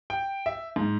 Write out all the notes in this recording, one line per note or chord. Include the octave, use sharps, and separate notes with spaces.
G5
E5
G#2